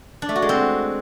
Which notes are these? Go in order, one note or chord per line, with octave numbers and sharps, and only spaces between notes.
D4
A3
F#4
G#3
C4